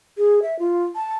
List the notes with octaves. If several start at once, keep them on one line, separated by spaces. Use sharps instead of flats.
G#4
E5
F4
A5